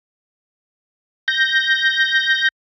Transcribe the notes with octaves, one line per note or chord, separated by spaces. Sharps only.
G6 A#6